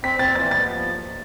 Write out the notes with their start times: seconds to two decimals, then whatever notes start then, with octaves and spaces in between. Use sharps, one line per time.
0.03 C4 B6
0.19 C4 A6
0.35 E3 A6
0.51 B3 A6
0.68 F3